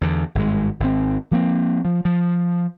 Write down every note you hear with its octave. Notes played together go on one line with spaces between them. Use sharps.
E2 D3
G#1 G2 G#3
G#1 C4
F3 A#3 C4
F3
F3